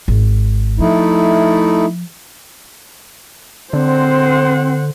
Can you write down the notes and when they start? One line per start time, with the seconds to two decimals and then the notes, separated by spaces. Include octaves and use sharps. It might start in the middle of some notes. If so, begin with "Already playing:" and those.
0.08 G#1
0.79 F3 A3 D#4 E4
3.73 D3 C4 C5 F#5